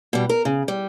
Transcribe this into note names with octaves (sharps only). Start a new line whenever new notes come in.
B2 G3
A#4
C#3
G3